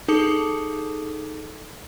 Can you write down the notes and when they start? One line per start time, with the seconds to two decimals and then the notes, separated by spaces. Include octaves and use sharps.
0.08 D#4 G#4 A4 A5 D6 D#6